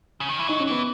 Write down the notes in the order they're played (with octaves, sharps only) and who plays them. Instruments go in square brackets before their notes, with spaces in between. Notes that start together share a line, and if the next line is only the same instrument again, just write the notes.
[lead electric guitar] C#3
D#3
E3
[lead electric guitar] F#3 [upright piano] D#4
[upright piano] C#4
[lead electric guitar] E3 [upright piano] B3